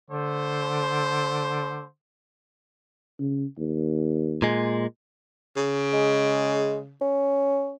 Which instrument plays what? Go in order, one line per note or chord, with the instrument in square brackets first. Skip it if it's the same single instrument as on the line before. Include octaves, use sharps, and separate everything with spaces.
[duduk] D3 [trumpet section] A3 C5
[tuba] C#3
D#2
[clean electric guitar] A#2 G#3
[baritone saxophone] C#3
[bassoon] G#3
C#4